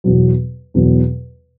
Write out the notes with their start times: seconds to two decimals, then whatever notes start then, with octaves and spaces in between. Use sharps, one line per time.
0.04 E2 B2 F#3
0.74 E2 B2 F#3